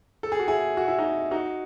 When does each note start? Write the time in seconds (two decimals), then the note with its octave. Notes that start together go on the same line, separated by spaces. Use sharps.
0.23 A4
0.32 G#4
0.40 F#4
0.48 E4 G#4
0.77 F#4
0.88 E4
0.98 D#4 F#4
1.31 D#4 F#4